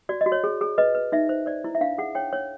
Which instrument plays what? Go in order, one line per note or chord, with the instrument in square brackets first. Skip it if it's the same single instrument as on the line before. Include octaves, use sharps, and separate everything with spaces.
[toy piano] F#4 D5
D#5
F#4
C#5
G#4
G#4
B4 D#5
B4
D#4 E5
C5
C5 D5
E4
E5
D4 F5
G#4 F#5
C#5 G5
C#5